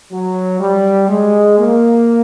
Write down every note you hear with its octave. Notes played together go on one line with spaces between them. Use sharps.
F#3
G3
G#3
A#3